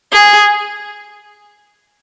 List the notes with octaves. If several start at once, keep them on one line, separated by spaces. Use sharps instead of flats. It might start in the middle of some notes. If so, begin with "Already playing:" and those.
G#4